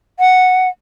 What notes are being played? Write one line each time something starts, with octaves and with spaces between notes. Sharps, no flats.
F#5